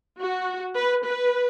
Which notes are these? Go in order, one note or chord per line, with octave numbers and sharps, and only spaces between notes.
F#4
B4
B4